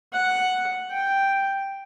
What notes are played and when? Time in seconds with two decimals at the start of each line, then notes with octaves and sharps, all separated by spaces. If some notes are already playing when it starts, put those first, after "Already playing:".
0.13 F#5
0.91 G5